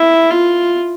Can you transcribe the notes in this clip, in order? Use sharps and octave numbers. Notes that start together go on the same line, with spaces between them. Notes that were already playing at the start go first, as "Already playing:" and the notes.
Already playing: E4
F4